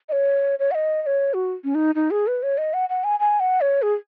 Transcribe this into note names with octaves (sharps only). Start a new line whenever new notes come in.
D#5
C#5
C#5
F#5
D#5
D#5
C#5
F#4
C#4
D#4
D#4
G#4
B4
C#5
D#5
F#5
F#5
G#5
G#5
F#5
C#5
G#4